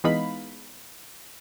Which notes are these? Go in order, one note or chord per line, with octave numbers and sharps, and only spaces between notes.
E3 G#3 B3 D#4 F5 B5